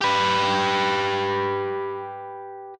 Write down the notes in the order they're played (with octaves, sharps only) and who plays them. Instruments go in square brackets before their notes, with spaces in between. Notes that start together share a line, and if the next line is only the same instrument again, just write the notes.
[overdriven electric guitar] G4 B4